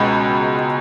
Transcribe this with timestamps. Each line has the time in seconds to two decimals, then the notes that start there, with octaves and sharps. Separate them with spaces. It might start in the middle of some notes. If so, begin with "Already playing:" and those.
Already playing: C#2 B2 G#3 B5